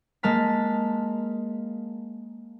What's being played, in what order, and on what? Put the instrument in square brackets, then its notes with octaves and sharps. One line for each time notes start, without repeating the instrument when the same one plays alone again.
[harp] G#3 A#3 A5 F6 B6